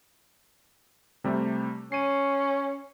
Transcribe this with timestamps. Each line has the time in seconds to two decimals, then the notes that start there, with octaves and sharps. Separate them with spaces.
1.24 C3 G3 A3
1.92 C#4 C7 D#7